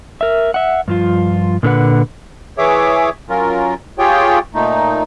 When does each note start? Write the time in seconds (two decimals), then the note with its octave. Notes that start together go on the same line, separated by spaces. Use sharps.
0.21 A#4 E5
0.54 E5 F#5
0.88 G2 F3 F4
1.63 A#2 D3 B4 F#5
2.58 E3 G#4 C#5 E5 D6
3.29 F#3 C#4 F4 A#4
3.99 F4 G4 G#4 C#5 G5
4.54 A#2 A3 D#4